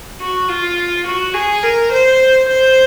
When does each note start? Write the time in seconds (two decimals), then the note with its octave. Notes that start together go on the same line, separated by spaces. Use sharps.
0.20 F#4
0.49 F4
1.06 F#4
1.34 G#4
1.63 A#4
1.91 C5
2.48 C5